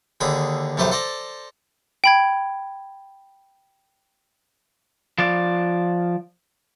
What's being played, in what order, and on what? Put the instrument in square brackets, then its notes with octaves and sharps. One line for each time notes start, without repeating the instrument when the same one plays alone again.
[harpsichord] D#2 D3 G#4 B5
B1 F#2 A3 G4 B4 C5
A4 C5 D5 A#5
[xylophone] G5 B5 G#6
[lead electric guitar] F3 D5